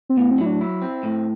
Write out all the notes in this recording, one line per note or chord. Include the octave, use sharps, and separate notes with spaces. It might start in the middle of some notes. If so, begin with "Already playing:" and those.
C4
A2 B3
C4
F#3 E4
D4
E4
C4
A2